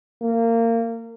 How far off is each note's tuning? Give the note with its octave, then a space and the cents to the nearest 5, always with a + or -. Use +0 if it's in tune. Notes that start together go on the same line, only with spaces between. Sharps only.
A#3 -25